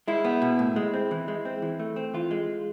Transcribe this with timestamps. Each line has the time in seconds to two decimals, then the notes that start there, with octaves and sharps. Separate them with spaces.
0.08 G#3 E4
0.25 B3
0.42 B2
0.59 A2
0.76 G#3
0.94 C4
1.11 E3
1.28 G#3
1.45 C4
1.62 E3
1.80 A3
1.96 C4
2.14 E3 F4
2.31 G#3